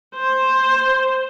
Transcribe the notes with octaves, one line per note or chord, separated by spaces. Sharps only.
C5